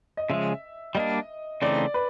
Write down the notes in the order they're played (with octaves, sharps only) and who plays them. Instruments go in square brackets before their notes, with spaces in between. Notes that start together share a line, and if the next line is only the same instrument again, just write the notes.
[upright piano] D#5
[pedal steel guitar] C#3 F3 G#3 [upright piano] E5
[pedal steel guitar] G3 A#3 D4 [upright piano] D#5
[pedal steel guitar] C#3 E3 A3 C4 D#4 [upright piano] D5
[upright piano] B4